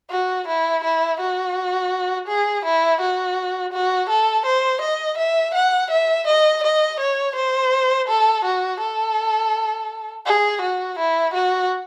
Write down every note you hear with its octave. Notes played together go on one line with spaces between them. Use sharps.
F#4
E4
E4
F#4
G#4
E4
F#4
F#4
A4
C5
D#5
E5
F#5
E5
D#5
D#5
C#5
C5
A4
F#4
A4
G#4
F#4
E4
F#4